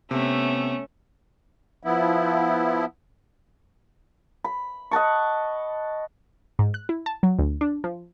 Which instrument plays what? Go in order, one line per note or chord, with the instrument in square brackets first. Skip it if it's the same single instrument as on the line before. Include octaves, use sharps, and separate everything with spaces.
[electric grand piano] C3 [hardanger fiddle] A3 C#4 [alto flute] B3
[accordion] F3 B3 E4
[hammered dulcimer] B5
D#5 F#5 A5 C#6
[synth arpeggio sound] G#2
F#6
E4
A5
F#3
D2
D4
F3